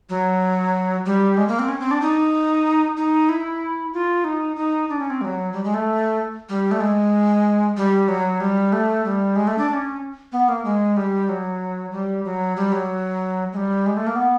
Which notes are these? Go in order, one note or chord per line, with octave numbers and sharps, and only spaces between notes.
F#3
G3
G#3
A#3
C4
C#4
C4
D4
D#4
D#4
E4
F4
D#4
D#4
D4
C#4
C4
G3
F#3
G3
G#3
A3
G3
A3
G#3
G3
F#3
G3
A3
G3
G#3
A3
D4
D4
C#4
B3
A#3
G#3
G3
F#3
G3
F#3
G3
F#3
G#3
G3
G#3
A3
A#3
B3